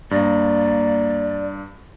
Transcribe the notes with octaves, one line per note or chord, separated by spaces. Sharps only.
G2 A#3 D5 A6 A#6